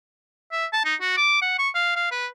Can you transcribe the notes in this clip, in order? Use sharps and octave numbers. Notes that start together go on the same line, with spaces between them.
E5
A5
D#4
F#4
D6
F#5
C#6
F5
F5
B4